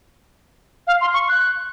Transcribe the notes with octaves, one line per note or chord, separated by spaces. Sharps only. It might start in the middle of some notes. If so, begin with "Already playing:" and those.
F5
C6
C#6
F#6